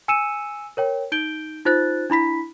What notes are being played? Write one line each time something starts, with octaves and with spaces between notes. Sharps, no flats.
G#5 E6 C#7 D#7 E7
A#4 C#5 G5
D#4 G6 D7 G7
D#4 F4 C5 F#6 A6
D4 E4 B5 B6